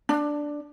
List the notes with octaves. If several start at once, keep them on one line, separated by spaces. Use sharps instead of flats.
D4